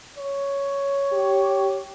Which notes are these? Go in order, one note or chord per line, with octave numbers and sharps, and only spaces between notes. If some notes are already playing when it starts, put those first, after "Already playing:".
C#5
G4